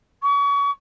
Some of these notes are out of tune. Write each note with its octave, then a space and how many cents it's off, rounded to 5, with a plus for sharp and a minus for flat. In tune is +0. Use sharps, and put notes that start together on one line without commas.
C#6 +35